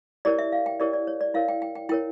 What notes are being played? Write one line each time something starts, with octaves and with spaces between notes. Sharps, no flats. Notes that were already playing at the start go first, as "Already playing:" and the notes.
E4 G4 A#4 C#5 D5
E5
F5
G5
E4 G4 A#4 C#5 D5
D5
C#5
D5
E4 A#4 C#5 F5
G5
G5
G5
E4 A#4 C#5 G5